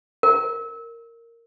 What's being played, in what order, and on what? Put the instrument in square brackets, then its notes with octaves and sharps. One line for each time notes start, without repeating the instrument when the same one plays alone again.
[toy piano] A#4